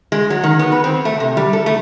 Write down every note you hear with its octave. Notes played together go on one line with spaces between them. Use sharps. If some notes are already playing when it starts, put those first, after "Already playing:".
G#3
F#3
D#3
B3
B4
C4
A3
C3
G3
A4
A3